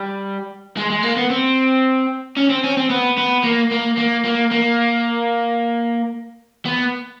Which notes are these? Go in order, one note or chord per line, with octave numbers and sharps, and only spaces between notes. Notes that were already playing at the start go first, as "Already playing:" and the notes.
Already playing: G3
G#3
G#3
A#3
B3
C4
C#4
C4
C#4
C4
B3
B3
A#3
A#3
A#3
A#3
A#3
B3